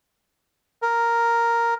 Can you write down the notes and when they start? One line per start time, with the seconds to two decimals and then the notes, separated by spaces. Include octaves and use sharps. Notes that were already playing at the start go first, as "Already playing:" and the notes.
0.82 A#4